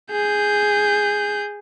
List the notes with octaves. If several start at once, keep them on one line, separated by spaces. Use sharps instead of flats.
G#4 G6